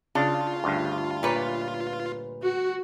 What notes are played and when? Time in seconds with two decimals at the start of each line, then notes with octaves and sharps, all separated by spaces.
0.15 C#3 D4 F4
0.64 D2 G2
1.23 A#2 B4 C#5
2.41 F#4